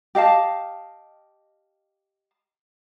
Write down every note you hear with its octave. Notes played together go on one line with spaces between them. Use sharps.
G4 D#5 F5 A5